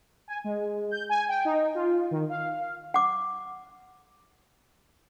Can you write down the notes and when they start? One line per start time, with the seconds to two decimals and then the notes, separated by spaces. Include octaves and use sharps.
0.28 G#5
0.44 G#3
0.91 G6
1.09 G#5
1.29 G5
1.45 D#4
1.75 F4
2.11 D#3
2.29 F5
2.94 F#5 D6